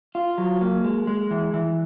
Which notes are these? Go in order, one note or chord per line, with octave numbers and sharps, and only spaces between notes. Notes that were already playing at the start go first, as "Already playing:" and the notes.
F4
F#3
A#3
G#3
G#3
E3
E3